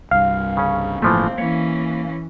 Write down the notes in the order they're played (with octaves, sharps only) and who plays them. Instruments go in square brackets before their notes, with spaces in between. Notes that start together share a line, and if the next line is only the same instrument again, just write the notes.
[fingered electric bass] C2 G2 [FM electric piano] F5
[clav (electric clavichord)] C#3 C#4
[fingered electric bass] G1 A2 A#3 [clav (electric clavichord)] E3 F3 A3 [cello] C4
[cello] E3 C#4 [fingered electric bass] A#3 [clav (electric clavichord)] C#5